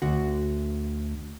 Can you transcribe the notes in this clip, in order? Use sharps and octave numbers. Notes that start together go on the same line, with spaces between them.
D2 F#4